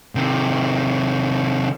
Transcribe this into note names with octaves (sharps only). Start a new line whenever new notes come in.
C3 D#3